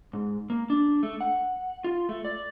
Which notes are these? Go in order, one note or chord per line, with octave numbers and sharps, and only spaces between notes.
G#2
A#3
D4
A3
F#5
F4
A3
D5